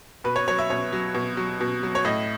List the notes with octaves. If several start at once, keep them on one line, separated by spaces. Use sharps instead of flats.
B2 B4
C#5
F#3 C#5
E5
B2 C#5
F#3
B2
F#3
B2
F#3
C#5
A2 D#5